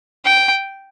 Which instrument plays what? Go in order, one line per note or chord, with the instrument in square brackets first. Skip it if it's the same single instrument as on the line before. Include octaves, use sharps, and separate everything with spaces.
[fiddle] G5